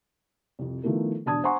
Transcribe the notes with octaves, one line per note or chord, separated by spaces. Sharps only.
C2 F2
D#3 F3 A3 B3 E4 A#4
E1 D4 A5 D#6 G#6
C5 F#5 G#5 A#5 C6 C#6